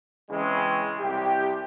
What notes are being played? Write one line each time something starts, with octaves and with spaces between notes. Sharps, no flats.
C#3 E3 G#3 C4 C#4
C2 C3 G4